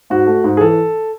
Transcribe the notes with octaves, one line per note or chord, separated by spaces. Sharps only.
G#2 F#4
A3
G#2
G#4
E3 A4